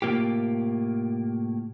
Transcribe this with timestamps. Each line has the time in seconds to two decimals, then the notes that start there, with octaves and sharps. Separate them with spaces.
0.02 A2 C3 A#3 F4 G4